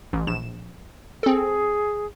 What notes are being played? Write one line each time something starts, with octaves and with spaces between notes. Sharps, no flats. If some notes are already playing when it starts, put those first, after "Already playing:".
A1
A#1 E7
C4 G#4 A4